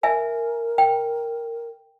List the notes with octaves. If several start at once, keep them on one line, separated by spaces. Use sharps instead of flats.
A#4 E5 G#5
G5